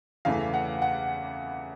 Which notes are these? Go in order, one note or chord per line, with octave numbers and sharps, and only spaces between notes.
E2 C#3 E3 A3 F5
F#5
F#5